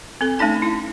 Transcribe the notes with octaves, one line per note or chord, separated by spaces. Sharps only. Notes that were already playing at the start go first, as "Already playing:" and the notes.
C4 A4
A3 C#4 D#4 A5
E4